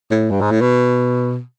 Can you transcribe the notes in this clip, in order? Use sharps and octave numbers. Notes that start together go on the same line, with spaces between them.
A2
G2
G#2
A2
B2